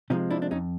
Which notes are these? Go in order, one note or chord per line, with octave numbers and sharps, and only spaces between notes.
C3 F3 G#3 C#4 D#4
D4 E4
D4
F2 C#4 D#4